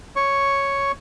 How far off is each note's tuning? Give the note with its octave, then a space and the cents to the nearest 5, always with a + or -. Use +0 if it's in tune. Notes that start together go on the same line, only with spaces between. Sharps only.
C#5 +0 C#6 +0